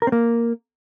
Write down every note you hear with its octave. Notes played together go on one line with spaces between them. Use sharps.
A#4
C4
A#3